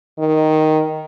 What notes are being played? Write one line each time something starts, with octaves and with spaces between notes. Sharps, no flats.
D#3